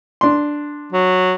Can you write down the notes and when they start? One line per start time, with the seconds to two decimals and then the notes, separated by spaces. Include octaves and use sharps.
0.21 D4 C6
0.93 F#3